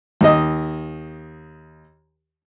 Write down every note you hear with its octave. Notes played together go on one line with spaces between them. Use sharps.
D#2 D#5